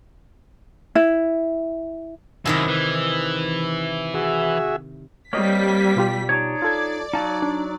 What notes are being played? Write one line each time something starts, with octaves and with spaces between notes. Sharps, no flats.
E4
F#2 C3 D#3 E4
E3
F#4 G#4 E5
G3 A#3 C4 C#5 D#5 B6
B2 F4 G4
D4 D#4 C#5
F4 A4 D5 G#6
F#3 D#4 F5 A5
D4